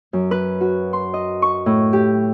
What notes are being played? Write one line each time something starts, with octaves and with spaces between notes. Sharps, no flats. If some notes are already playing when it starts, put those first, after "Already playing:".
F#2
B4
F#4
C6
D#5
C#6
A2
G4